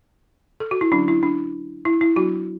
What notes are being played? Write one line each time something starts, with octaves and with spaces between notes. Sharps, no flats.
A4
F#4
E4
D3 F#3 C#4 D4
E4
D4
E4
E4
F#3 B3 D4 F#4